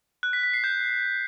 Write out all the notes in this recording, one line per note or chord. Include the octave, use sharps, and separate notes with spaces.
F#6
B6
B6
C7
G6